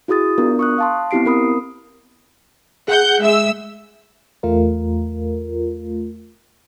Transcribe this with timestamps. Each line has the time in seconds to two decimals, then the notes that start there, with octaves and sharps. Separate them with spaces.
0.08 E4 F#4 G#4 D#6 A6
0.38 B3 D4 F4 A#4
0.59 C#6 D#6 F#6
0.78 F5 A5 C6
1.11 B3 C4 E4 G4 C7 D7
1.25 C4 A#4 B5 D#6
2.88 G#4 F#5 G6
3.21 G#3 E5 E6
4.43 E2 A3 F4 A#4